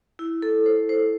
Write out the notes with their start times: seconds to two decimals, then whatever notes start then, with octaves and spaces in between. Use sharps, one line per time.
0.19 E4
0.42 A4
0.66 C5
0.89 C5